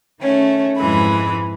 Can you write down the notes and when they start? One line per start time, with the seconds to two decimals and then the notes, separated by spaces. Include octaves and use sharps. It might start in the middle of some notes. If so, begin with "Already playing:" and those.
0.19 D#3 A3 C#4
0.77 F2 G#2 E3 G#3 B5